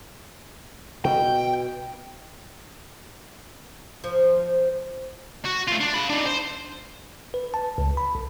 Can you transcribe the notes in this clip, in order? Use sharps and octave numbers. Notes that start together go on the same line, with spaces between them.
B2 G5
F3
F#4
A3 F4
D4
F5 B5
D4 D#4
C5
B4
A5
C#2
B5
B1